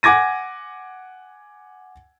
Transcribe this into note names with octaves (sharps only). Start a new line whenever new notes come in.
F#5 G#5 D6 G#6 A#6 D#7